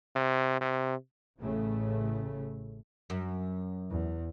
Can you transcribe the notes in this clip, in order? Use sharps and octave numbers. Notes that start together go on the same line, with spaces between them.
C3
C3
A1 A2 C#3 A3
F#2
E2